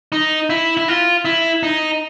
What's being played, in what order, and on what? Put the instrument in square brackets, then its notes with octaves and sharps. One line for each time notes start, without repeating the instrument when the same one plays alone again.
[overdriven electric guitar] D#4
E4
E4
F4
E4
D#4